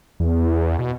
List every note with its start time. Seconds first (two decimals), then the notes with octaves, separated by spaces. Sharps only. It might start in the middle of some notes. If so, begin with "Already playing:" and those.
0.20 E2
0.79 B2